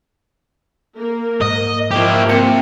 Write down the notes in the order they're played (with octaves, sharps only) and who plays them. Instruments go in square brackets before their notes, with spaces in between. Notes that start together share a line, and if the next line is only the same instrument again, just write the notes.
[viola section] A#3 A#4
[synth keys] G#2 [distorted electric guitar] D#5
[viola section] F3 A#3 [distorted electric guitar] E4 G4
[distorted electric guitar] C3 [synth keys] C#7